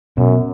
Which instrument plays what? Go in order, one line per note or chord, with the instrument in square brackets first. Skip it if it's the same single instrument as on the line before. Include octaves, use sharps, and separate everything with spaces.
[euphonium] F#2 [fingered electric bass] B2